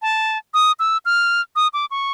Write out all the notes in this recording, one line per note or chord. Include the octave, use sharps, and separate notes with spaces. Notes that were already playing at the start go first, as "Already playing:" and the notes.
A5
D#6
E6
F6
D#6
D6
C#6